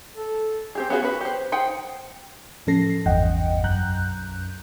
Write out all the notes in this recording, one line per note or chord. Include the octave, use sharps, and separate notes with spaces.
A4
C4 G4 G#4
B3 C#4 F4 F#4 G#4
C#4 F#4 B4
G4 C5
D#4 G#4 C5 F#5 G5
A2 F3 C#4 A4 A#6 C7
G#1 E2 G2 D#5 F#5 G5
B1 F#2 A#5 F#6 G6